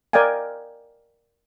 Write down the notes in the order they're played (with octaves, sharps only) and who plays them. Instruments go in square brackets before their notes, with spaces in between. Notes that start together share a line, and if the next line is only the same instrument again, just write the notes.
[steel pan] A#4 D5 D#5 F5 G5 G#5